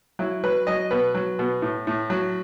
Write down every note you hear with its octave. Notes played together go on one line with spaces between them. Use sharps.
F#3 E4
F#3 B4
F#3 D#5
B2 B4
F#3
B2
A2
A2
F#3